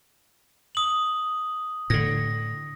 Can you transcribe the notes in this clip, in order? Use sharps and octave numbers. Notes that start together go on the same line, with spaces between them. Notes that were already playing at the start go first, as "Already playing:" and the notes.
D#6 F#7
A2 D3 A#6